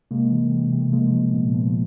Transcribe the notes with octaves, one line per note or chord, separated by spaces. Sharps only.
C3 G#3 A#3
E3
C3
C3
A3
F3 G#3 A#3
F3
A#2 A3 B3
F3